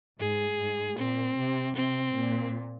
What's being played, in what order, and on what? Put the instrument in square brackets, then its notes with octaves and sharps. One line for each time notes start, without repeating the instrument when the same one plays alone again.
[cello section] G#2 [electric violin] G#4
[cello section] G#2
[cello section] A#2 [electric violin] C4
[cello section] C3
[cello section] C3 [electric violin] C4
[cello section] A#2